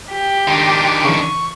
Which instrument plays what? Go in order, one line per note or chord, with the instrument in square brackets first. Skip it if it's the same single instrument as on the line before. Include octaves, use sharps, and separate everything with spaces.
[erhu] G4
[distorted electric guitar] D#3 D4 [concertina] C6
[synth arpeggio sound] C#3 E3 [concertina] C#6